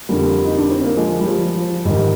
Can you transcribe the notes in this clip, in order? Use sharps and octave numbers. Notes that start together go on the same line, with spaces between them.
F2 D3 G3 A#3
D#4
D4
C4
A#3
F3 G#3
G3
F3
F3
G#2 D#3 G3